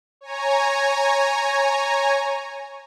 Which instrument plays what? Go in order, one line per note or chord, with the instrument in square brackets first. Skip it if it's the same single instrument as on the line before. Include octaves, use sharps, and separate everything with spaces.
[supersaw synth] C#5 G#5 A#5